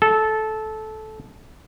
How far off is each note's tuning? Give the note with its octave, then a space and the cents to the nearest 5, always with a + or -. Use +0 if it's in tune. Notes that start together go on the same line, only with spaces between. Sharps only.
A4 -15